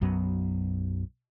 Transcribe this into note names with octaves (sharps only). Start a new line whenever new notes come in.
B1 F#2 F#3 B3